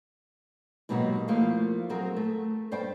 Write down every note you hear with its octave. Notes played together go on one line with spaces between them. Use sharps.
G#2 B2 F#3 A#3 D#4 G4
F3 A3 A#3 E4 F5
F#3 C4 G#4 A#4
A3
G2 C5 D5 G5